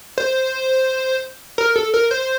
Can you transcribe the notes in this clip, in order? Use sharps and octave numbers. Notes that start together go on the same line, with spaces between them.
C5
A#4
A4
A#4
C5